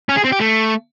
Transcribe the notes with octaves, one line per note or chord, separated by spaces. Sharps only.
C#4
G#4
C4
G4
A3